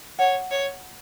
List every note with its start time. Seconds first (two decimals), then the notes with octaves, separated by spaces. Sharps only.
0.19 C#5 F#5
0.51 C#5